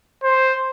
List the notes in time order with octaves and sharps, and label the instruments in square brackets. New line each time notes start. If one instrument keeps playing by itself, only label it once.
[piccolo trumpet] C5